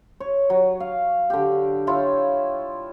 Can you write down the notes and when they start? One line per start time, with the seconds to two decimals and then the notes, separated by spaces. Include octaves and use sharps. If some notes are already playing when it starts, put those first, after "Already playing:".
0.20 C#5
0.50 F#3
0.80 F5
1.30 D3 G4
1.87 E4 F4 C#5